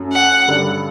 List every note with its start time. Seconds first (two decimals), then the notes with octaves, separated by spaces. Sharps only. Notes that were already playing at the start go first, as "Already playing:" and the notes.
Already playing: F#2 F#3 A3
0.13 F#5
0.48 G2 D3 G3 D4